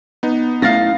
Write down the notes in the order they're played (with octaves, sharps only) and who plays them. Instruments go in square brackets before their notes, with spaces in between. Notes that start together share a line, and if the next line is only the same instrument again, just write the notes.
[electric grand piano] B3 D#4
[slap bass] A3 A#3 C#4 [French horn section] E4 [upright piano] F5 A6 A#6